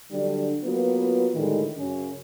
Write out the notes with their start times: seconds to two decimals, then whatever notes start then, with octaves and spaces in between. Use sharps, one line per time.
0.11 D3 F#3 G3 D4
0.64 F#3 A#3 B3 F4 B4
1.35 A2 D3 D#3 G3 G#3
1.78 F#2 C#3 C#4